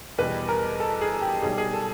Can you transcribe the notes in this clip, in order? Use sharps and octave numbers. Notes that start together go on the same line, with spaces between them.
E2 B2 G3 B4
A#4
A4
G#4
G4
B1 B2 G3 G#4
G#4
A4